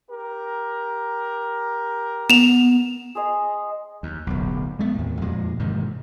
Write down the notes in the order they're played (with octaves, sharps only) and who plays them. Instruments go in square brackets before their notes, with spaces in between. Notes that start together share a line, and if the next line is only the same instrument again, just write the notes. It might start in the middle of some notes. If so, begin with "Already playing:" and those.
[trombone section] G4 A#4
[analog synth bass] B3 [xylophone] E7 F7
[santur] G#4 C5 D#5 G#5
[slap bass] D#2
D1 B1
G#3 A3 B3
D#2 A2
F2 A#2 F3 G#3
G#2 C3 D#3 E3